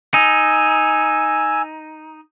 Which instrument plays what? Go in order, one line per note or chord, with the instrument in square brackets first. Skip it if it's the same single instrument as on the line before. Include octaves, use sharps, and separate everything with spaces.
[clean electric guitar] D#4 [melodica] G#5 E6